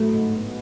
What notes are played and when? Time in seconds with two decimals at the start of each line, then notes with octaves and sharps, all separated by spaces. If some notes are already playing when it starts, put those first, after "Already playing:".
Already playing: A2 F#3 A3
0.13 G#2
0.34 B3